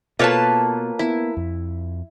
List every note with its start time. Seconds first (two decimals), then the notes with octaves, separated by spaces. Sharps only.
0.19 B2 A#3 F4 A4 B4 C#5 A5
0.99 B3 E4
1.37 F2